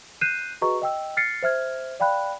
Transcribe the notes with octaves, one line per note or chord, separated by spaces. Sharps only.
F#6 G6 C7 D#7 E7
F#4 G#4 B4 D#5 A#5 C#6
D#5 G5 E6
F6 A6 C7 C#7
C5 E5 F6 G#6
D5 F5 G5 B5 F#6